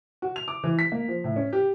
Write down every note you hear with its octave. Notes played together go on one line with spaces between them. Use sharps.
F#4
F7
D6
E3
B6
A#3
F3
A2
C#4
G4